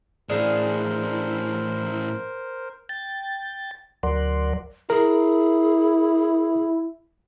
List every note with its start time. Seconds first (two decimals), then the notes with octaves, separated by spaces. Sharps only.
0.29 A2 E3 D4 G#4 A#4 C5 F5
2.89 G5 A6
4.03 D2 F#3 A#4 D5 F#5 C6
4.90 E4 G#4 A#4